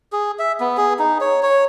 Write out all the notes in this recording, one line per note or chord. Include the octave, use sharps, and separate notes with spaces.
G#4
E5
B3
G#4
D#4
C#5
C#5